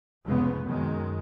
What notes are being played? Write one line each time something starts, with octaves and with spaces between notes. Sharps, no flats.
F1 C#2 G#2 C#3 G#3 B3
F#2 D#3 G#3